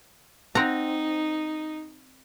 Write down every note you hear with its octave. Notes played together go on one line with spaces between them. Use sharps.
C4 D#4 F#5 A#5